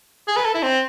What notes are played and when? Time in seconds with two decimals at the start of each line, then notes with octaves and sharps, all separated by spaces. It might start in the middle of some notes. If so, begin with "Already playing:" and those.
0.28 G#4
0.36 B4
0.45 A4
0.54 E4
0.63 C4